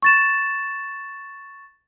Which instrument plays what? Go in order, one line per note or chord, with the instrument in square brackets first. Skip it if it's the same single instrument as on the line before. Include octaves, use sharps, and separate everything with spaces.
[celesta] C#6 A6 E7